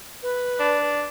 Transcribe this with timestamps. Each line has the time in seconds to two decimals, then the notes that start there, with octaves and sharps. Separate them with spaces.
0.23 B4
0.60 D4